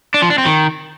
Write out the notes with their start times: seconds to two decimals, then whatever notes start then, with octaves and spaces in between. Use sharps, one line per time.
0.14 D4
0.22 F3
0.30 D4
0.38 C4
0.46 D#3